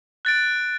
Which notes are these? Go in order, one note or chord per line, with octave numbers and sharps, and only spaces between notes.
F#6 A6 D7